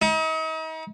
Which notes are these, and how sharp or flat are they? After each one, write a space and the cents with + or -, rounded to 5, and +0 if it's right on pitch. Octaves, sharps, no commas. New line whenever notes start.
D#4 +40